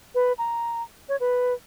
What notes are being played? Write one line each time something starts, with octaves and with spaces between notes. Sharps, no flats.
B4
A#5
C#5
B4